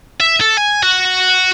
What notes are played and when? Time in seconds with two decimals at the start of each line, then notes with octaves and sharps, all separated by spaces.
0.20 E5
0.41 A4
0.57 G#5
0.83 F#4 F#5